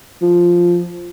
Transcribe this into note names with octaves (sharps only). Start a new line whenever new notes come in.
F3